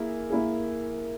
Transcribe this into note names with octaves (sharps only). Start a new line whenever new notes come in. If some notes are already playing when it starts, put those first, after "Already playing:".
Already playing: A#3 E4 G#4
A#3 E4 G#4